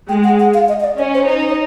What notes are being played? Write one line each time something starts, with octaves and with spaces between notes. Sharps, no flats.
G#3 G5
F#5
F#5
F5
D#5
D#5
D5
C#4 C#5
C5
D#4 C5
C5
C#5